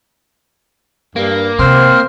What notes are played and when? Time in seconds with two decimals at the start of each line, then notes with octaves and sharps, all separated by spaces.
1.16 G2 A#3
1.59 C3 D#3 C4 C5 F6